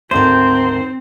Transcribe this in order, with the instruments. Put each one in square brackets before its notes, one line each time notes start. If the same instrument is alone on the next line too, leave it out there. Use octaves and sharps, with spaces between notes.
[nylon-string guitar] D2 G#2 D#3 [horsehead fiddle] C4 [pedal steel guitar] C5